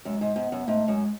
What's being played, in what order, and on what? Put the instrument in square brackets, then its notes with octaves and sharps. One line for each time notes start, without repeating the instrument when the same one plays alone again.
[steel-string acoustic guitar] F#2 [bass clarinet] G#3
[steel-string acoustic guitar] G#2
[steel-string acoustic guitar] G#2 [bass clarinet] B3
[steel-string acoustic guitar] F#2
[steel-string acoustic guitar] G#2 [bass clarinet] A3
[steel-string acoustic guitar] F#2 [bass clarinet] G#3